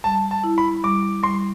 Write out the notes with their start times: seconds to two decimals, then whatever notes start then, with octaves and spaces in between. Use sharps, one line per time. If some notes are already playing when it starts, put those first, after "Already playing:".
0.04 G3 A5
0.31 A5
0.44 E4
0.58 B5
0.84 G3 D6
1.23 G3 C6